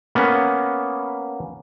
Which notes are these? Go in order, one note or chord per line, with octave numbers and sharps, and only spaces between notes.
A#3 B3 C#4